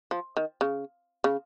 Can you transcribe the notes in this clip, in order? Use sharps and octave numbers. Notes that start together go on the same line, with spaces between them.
F3
D#3
C#3
C#3